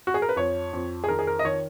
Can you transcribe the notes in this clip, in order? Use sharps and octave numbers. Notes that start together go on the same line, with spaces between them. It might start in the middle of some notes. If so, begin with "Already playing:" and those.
F#4
G#4
A#4
B4
F2 C#5
F2
G#4
D#3 A#4
G#4
A#4
D#5
D#3 C#5